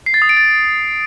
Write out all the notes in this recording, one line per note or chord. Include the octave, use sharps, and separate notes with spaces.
C7
A6
D#6
D7
A6